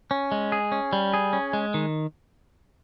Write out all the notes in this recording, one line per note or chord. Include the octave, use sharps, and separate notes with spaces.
C#4
G#3
G#4
C#4
G3
G#4
C#4
G#3
D#3